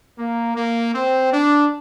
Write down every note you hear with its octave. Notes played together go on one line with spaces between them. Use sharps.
A#3
A#3
C4
D4